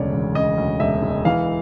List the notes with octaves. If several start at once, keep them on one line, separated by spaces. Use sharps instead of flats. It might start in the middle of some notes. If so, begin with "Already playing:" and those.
Already playing: E1 D2 C#3 C#5 D5
E1
C#3 D#5
D2
E1 E5
E1
E3 F5